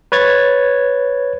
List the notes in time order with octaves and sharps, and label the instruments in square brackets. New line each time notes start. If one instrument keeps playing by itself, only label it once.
[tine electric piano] B4 C#5 G#6 A6